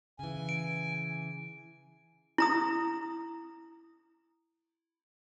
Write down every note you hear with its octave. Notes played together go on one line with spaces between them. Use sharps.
C#3 E3 G#5
D7
E4 A#5 D#6